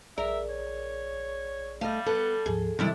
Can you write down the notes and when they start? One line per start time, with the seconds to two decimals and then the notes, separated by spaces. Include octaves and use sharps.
0.18 A#1 G#4 A#4 D5 E5
0.50 C#5
1.81 G3 A3 D#5 F5
2.06 B3 A4
2.46 D2 G#2 F3 G#4
2.79 C3 D#3 E3 G3 D4 E4